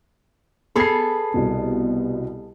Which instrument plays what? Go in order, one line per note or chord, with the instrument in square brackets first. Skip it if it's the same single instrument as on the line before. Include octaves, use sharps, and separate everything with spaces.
[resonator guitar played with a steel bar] B3 G#4 A4 [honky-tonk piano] B5 C7
[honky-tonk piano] C2 B2